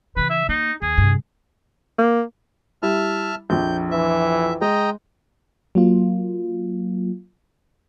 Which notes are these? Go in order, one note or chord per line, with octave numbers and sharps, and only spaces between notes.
C#3 E3 B4
E5
A#3 D#4
D#2 G#4
G2 C3
A#3
G3 E4 E5 A5 F6
A#1 F2 G6
E3 E5
G#3 D#5 G5 A#5
F#3 A#3 F4